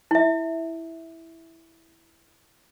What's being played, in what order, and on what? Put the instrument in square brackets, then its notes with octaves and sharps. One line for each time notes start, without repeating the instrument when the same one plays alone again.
[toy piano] E4 E5